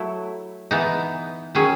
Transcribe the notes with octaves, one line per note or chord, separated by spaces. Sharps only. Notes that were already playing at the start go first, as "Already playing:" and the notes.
Already playing: F#3 A3 E4
E3 B3 D#4
D#3 F#3 C#4 G#4